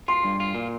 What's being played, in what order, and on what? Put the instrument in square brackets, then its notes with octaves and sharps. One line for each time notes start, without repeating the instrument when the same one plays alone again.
[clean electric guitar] F4 [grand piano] C6
[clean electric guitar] G2
F4
A#2